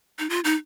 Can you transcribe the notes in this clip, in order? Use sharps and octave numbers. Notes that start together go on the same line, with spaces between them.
D#4
F4
D#4